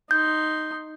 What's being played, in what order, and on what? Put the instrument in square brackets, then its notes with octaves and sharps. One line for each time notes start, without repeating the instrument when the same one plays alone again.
[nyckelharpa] D#4 C6 [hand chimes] G6